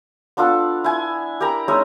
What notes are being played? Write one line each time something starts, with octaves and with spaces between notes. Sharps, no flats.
B3 D4 F4 A4
E4 G#5
G4 A#4 A#5 B5
G#3 C#4 D#4 E5